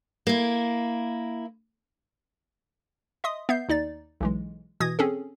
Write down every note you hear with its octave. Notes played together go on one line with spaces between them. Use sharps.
A#3 E4
D#5 E5 C6 D#6
B3 E5 G6 C7
D#2 D#4 D5 A6
B1 E3 G#3
B2 E3 D#6 G#6 A#6
C4 C#4 G#4 A4